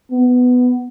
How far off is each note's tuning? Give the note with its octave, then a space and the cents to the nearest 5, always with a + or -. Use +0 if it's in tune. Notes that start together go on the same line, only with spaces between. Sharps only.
B3 +10